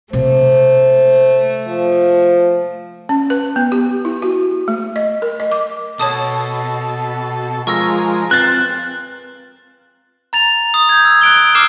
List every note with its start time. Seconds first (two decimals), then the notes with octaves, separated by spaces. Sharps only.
0.13 C3 A3 A#3 C5
1.67 F3
3.09 C#4
3.30 B4
3.56 B3
3.72 G4
4.05 E4
4.22 F#4
4.68 A3
4.96 D#5
5.22 A#4
5.40 D#5
5.52 D6
6.00 B2 A4 C#5 A5 D#6
7.67 F3 G#3 A#4 C#6 E6 A#6
8.31 C4 F4 B4 F#6 A6
10.33 A#5 A6 F7
10.74 D#6
10.89 G6 G#6
11.05 E6
11.21 F#6 D7 G7
11.55 D6 E6 F6 C7 E7